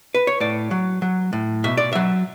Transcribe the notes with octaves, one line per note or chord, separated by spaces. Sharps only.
B4
C#5
A2 D5
F#3
F#3
A2
B2 E5
D5
F#3 E5